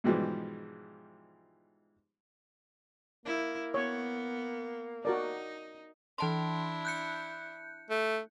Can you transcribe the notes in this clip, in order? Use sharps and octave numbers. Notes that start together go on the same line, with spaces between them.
G#2 B2 E3 F3 G3 G#3
A#3 E4
B3 C#5
D#4 F#4 A#4 D5
E3 D4 E4 A5 C6
F#6 G6 C#7
A3